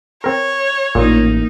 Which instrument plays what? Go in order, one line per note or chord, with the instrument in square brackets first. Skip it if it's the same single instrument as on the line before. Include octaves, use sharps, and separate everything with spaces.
[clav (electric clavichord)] C4 A#4 [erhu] C#5
[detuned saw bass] A1 [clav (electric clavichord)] A#2 [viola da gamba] A#3 D#4